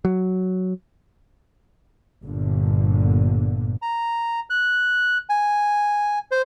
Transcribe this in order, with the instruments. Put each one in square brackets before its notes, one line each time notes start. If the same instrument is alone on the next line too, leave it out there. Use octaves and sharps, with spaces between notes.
[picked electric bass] F#3
[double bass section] G1 A#2 D3
[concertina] A#5
F#6
G#5
C5